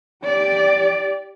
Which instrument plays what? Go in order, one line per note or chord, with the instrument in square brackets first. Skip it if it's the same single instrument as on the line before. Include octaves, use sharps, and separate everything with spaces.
[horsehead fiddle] G4 D5